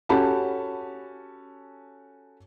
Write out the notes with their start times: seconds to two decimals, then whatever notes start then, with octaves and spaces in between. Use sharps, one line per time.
0.09 C#4 F#4 G4 A4 A5 B5